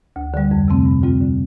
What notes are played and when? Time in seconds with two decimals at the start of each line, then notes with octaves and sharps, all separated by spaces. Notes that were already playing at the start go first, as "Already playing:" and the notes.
0.16 D2
0.34 D3 G3
0.51 F2
0.68 C3 A3 C4
0.85 G2
1.02 D3 G3 C4 F4
1.21 D3